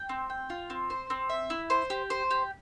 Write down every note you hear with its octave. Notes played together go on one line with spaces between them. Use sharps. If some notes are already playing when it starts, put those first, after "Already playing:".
Already playing: G5
C4
G5
F4
C4
C5
C4
E5
E4
C5
G4
C5
G4